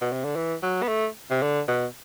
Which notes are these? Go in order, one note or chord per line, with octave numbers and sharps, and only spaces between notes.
B2
C3
D3
E3
F#3
B3
A3
C3
D3
B2